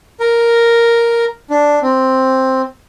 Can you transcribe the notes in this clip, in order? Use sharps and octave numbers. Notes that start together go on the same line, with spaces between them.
A#4
D4
C4